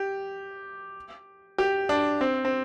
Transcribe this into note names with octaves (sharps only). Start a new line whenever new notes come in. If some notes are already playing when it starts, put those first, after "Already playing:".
Already playing: G4
G4
D4
C4
C4